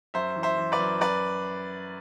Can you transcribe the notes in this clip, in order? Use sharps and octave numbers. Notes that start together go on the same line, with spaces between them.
F#2 C5 E5
E3
C5 E5
E3
B4 D5
F#2
F#2 B4 D5